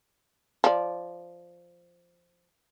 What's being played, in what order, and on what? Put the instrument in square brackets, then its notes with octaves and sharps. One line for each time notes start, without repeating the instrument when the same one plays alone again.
[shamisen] F3 D5